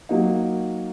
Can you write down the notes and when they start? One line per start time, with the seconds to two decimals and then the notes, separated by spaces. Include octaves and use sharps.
0.09 F#3 A#3 D#4